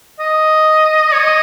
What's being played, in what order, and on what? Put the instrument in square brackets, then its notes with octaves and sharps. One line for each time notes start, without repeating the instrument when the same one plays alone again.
[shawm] D#5
C#5
D#5